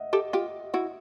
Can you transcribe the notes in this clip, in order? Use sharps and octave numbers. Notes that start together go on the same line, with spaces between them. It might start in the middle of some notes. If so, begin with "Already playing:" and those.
Already playing: D#5 E5 F#5
G4 A4
F4 G4
E4 F#4